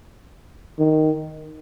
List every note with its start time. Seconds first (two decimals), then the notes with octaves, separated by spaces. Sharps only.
0.79 D#3